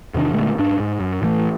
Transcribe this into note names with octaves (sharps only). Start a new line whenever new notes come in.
E2 C3 D#3 D4
A#2 D3 G#3 A3
G#2 D4
G#2
F#2
A2 E3 A3